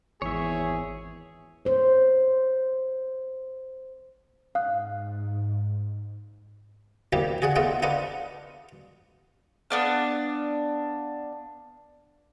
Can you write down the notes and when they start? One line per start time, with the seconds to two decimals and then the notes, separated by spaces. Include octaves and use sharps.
0.22 G#1 E2 G#4 C#5 E5
1.65 C5 C#5
4.55 G#2 F5 D#6 F#6
7.13 A1 D2 C3 G3 A#3 G4
7.42 F#4 G#4 C#5 D5 F#5
7.56 G3 A3 B3 F4 A4 D#5
7.82 D4 F4 B4 D#5 F#5
9.70 B3 D4 F5